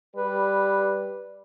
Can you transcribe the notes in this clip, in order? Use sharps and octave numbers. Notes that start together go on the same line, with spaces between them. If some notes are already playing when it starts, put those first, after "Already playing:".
G3 B4